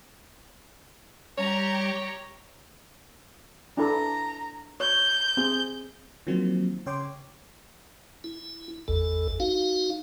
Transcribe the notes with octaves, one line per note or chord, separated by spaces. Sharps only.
G3 G4 C#5 A#5
D4 E4 A4 A#5
C#5 G6
C4 G#4
D#3 F3 F#3 A#3 C4
C#3 C#5 G5 C6 D6
E4
G#1 E2 A4
D#4 F#4 F5